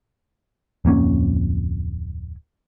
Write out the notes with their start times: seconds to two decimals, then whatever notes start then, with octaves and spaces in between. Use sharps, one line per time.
0.85 D1 F2 A#3 C#4